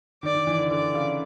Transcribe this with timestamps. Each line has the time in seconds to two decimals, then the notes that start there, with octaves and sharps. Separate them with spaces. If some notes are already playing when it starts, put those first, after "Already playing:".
0.23 D#3 D5
0.35 D#3
0.47 E3
0.59 D3
0.70 D3 D5
0.94 C#3